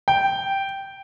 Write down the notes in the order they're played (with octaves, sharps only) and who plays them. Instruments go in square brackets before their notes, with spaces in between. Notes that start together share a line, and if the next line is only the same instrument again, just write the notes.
[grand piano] G5